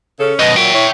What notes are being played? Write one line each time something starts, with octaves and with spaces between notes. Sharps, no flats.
C#3 C#4 A4
F#2 B2 B4 D#5
A#2 F#3 E5 G5
E4 C#5